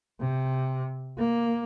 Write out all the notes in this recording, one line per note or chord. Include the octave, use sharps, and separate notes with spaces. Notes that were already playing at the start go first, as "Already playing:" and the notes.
C3
A#3